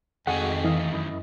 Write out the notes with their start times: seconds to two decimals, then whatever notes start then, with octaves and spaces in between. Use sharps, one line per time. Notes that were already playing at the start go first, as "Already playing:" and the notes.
0.27 F2 D#3 G#3 A3 F#4 G#4 F#5 G#5
0.65 E3 D#5 F5
0.92 F#2 E4 D#5